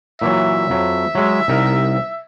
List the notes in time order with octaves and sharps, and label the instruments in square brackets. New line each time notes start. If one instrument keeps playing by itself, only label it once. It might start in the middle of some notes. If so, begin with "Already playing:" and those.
[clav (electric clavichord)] A#2 E3 F#3 [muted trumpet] E5
[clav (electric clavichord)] F2 F#3
F#3 G#3
C2 D#4 A#4